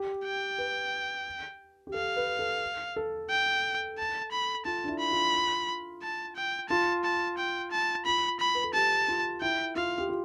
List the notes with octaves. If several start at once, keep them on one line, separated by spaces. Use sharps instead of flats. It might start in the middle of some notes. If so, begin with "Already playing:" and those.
Already playing: G4
G5
B4
G4
A4 F5
B4
A4
A4
G5
A5
B5
F4 A5
D4
E4
B5
F4
A5
G5
F4 A5
A5
G5
A5
F4 B5
B5
B4
A4
G4 A5
F4
E4 G5
F4 F5
G4
F4